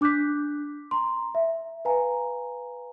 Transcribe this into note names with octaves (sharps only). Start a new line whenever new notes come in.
D4 D6 F#6 G6 B6
A#5 C6
E5
B4 F5 G#5 A#5